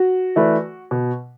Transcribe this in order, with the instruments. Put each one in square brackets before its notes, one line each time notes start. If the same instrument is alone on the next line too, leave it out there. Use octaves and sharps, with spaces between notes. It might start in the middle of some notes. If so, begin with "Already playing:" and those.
Already playing: [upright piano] F#4
[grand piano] E3 A3 E4 B4 D5
B2